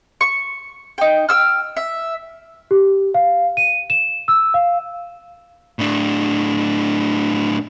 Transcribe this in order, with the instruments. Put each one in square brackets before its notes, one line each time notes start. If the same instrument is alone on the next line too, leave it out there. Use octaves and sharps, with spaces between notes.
[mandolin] C#6
D#4 G5
G5 E6 F6
E5
[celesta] G4
F5
D#7
E7
E6
F5
[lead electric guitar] A2 D4